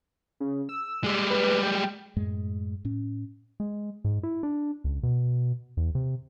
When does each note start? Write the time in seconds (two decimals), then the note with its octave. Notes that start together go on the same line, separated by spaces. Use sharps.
0.40 C#3
0.69 E6
1.04 G3 G#3
1.30 B4
1.63 G5
2.16 F#2 A2 G#3
2.85 A2 C#4
3.60 G#3
4.04 G#2
4.23 E4
4.43 D4
4.84 C#2
5.03 B2
5.77 E2
5.95 C3